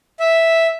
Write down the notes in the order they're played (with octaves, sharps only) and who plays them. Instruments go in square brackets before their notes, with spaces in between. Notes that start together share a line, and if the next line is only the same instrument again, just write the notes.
[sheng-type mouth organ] E5